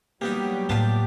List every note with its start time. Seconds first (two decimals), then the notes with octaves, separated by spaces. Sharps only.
0.21 F#3 G3 A#3 B3 D#4 G4
0.69 A2 A#3 B3 F4 A5